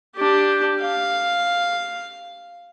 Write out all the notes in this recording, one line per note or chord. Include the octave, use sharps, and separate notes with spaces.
D4 G4
F5